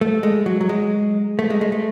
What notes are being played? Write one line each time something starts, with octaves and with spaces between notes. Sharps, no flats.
A3
G#3
F#3
F#3
G#3
A3
G#3
G#3
A3